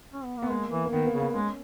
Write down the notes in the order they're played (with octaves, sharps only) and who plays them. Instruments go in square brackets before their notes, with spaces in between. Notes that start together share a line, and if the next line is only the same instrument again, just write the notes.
[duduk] C#4
B3
A#3
[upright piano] B3
[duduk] G#3 [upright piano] A#3
[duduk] E3 [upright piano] A#3
[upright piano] A#3
[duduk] D#3 [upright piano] B3
[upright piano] A#3
[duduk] C#3
[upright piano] B3
[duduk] G#3 [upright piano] C#4